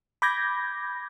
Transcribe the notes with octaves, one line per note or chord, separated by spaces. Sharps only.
B5 D6 G6 G#6 A#6